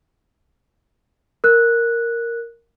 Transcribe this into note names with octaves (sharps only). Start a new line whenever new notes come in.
A#4 F#6